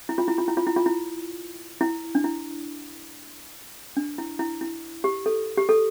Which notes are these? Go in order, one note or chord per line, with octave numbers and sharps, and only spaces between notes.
E4
F4
E4
F4
E4
F4
E4
F4
E4
E4
D4
E4
D4
E4
E4
E4
G4
A4
G4
A4